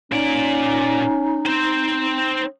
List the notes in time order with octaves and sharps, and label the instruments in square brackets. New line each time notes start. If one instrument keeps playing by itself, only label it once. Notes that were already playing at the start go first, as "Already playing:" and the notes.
[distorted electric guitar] A#2 D5 [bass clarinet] C#4 [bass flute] D#4
[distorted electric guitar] C4 C5